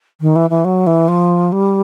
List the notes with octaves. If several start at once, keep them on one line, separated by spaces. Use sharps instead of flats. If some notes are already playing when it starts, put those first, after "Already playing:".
D#3
E3
E3
F#3
E3
F3
G3